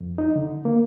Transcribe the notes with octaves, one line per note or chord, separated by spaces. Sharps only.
F2
D#4
D3
A#3